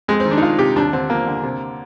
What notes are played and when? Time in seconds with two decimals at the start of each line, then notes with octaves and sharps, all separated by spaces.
0.08 F2 G#3
0.20 C4
0.25 D#3
0.31 D4
0.37 D#4
0.42 D#3 F4
0.59 C3 G4
0.76 D#2 D4
0.93 D3 C4
1.10 F3 A#3
1.27 D3
1.43 C3